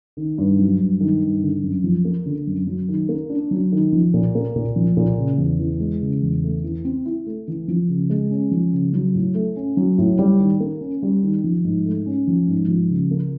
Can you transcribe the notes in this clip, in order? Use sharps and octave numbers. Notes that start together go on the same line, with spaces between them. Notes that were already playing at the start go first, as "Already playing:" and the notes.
D#3
G2
F#3
G2
D#3
G2
D3
F#2
F3
A#3
D3
F#2
F#3
D#3
A#3
D4
F#3
D#3
F3
A#2
A#3
A#2
F3
A#2
C#3
E2
E3
G#3
C#3
E2
A3
E3
C4
E4
A3
E3
F3
C#3
G#3
C#4
F3
C#3
F#3
A2
A3
C#4
F#3
A2
G3
D#3
A#3
C#4
G3
D#3
F3
G#2
A3
C#4
F3
G#2
F3
C#3
A#3